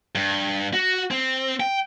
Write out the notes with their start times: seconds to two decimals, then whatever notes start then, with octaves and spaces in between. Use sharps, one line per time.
0.15 G2
0.73 F#4
1.11 C4
1.60 G5